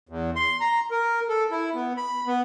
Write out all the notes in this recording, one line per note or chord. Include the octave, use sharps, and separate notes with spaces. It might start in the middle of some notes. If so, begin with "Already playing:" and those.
E2
C6
A#5
A#4
A4
E4
B3
B5
B3